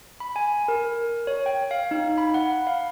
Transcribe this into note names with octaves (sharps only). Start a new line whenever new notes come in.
B5
G#5
A#4
C#5
G5
F5
D#4
B5
F#5
F5